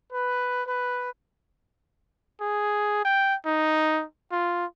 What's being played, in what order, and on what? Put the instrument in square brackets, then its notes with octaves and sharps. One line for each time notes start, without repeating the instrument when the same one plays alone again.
[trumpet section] B4
B4
[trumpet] G#4
G5
D#4
F4